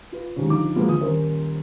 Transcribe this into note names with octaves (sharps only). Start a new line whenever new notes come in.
F4 B4
D#2 G#2 D3 C#4
D3 F3 D#4 D6
F3 F#3 G#3 A#3 B3 F4
D2 D#6
D#1 C#4 A#4 C5